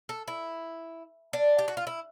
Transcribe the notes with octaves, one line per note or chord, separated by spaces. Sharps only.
A4
E4
D4
G4
F#4
F4
E4